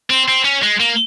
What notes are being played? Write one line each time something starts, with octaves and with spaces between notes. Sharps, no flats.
C4
C4
C#4
G#3
A#3